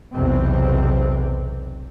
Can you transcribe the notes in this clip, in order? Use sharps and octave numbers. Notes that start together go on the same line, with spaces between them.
B1 E2 C3 C4